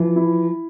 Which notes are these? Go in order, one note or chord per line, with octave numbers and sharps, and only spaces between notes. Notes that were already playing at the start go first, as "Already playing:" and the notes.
Already playing: E3 F3
E4